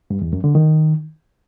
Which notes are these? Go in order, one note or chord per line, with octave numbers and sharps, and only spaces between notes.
G2
E2
F#2
D3
D#3